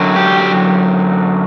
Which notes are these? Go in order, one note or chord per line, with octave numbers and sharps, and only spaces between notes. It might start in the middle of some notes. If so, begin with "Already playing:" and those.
Already playing: F#2 D3 F#3
G4